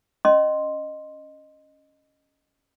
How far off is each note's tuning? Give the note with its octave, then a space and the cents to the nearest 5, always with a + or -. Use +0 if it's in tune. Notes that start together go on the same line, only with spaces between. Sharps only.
C#4 +0 D#5 -10 C6 +0